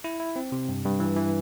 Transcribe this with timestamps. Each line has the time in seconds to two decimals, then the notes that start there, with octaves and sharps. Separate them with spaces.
0.04 E4
0.20 E4
0.36 C4
0.52 C3
0.69 G2
0.85 G2
1.00 E3
1.17 E3